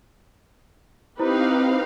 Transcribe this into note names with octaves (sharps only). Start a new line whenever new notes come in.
C4 D#4 E4 G4 B4 C5 F5 A#5